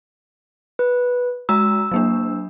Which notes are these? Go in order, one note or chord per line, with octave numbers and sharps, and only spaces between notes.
B4
G#3 F#4 A#5 E6
F#3 A#3 D4